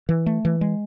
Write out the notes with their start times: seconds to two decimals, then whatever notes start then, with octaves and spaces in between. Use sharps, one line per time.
0.09 E3
0.26 A3
0.45 E3
0.61 G#3